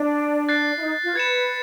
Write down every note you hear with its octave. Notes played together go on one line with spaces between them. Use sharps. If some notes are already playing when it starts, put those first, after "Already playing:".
Already playing: D4
F#6 A6 C7
E4
D#4
F4
B4 G#6 C#7 E7